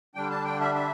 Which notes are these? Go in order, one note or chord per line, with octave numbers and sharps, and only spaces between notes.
D3 G3 D4 G5
A5
G5
E5
E5